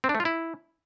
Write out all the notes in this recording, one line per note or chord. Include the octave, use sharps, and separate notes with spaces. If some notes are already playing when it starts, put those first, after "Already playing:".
C4
D4
A3
F4
E4